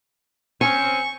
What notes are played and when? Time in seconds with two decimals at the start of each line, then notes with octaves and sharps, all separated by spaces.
0.61 C4 C#4 G#5 C#6